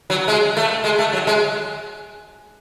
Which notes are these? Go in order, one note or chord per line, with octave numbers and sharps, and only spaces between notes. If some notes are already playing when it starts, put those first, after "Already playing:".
F#3
G#3
A3
G#3
A3
F#3
G#3